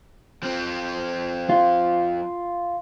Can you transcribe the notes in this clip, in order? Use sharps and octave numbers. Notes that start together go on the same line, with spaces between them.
F3 C4
F4